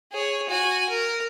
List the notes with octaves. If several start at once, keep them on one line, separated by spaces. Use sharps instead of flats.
G#4 C#5
F#4 G#5
A#4